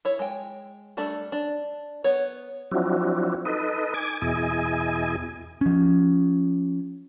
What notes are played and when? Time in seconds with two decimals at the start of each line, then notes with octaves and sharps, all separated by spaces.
0.05 E4 C#5
0.19 G#3 G5
0.97 G3 A3 D4 A4
1.32 D4
2.04 B3 C#5
2.71 F3 F#3 C4 D4 E4 F#4
3.45 D#4 A4 B4 D#5
3.94 G#5 D6 G#6
4.22 E2 B2 E4 G#4 D#5 G#5
5.61 F3 C#4